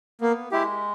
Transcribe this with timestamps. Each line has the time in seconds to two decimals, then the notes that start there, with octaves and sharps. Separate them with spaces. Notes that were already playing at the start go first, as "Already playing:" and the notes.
0.21 A#3 B3
0.52 G#3 E4 G4